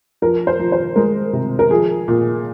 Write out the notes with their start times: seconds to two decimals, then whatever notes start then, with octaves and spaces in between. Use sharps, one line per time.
0.22 F3 A#4
0.47 C5
0.59 F3
0.72 C5
0.96 G#3 A#4
1.33 C3
1.59 A#4
1.70 F3 G#4
2.08 A#2